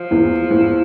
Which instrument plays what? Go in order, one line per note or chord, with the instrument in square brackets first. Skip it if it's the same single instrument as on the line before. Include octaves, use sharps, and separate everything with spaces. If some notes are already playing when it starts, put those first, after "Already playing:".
Already playing: [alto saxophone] F3
[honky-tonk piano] E2 E3
E2 E3